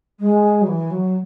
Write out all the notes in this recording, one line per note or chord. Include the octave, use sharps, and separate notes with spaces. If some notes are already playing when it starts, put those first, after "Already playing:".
G#3
F#3
E3
F#3